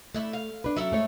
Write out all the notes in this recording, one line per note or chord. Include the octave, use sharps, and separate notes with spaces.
A3 D4 E4
F5
D4 B4
F#3 C#4 E4 A4 E5
G#2 A3 C#5